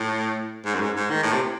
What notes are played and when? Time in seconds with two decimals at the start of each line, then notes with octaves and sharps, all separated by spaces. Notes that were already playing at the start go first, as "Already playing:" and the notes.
Already playing: A2
0.65 G#2
0.74 F#2
0.80 G#2
0.96 G#2
1.10 D#3
1.23 A2
1.33 C3